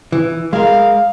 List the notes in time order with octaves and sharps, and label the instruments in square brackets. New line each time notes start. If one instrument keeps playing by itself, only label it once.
[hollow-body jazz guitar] E3
[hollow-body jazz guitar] G#3 A#4 [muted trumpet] F5